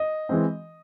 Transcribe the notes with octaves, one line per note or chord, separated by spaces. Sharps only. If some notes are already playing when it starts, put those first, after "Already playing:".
Already playing: D#5
E3 G#3 C4